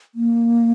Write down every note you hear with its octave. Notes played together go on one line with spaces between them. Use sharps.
A#3